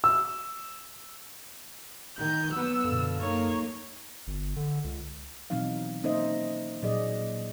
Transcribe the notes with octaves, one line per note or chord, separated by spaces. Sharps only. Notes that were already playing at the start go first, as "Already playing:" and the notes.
E6
D#3 G6
F#3 B3 E6
F#2 B2 D3 A4 F5
A#3 D#4 C#5
G1
D3
C#2
B2 E3 F#3 C4 D#4 F5
A#3 C#4 D#4 C5 D#5 E5
A#2 F#3 G#4 D5 D#5